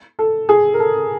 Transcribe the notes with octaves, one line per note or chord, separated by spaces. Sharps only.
A4
G#4
A#4
A4